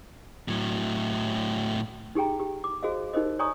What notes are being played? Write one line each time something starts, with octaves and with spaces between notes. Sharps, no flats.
A2 F#3
D#4 G4 G#4 G5 A#5
G4
D6
F#4 G#4 C5 D#5 F5
D#4 G4 A#4 C5 D#5
C#5 D5 G#5 A#5 C#6 D#6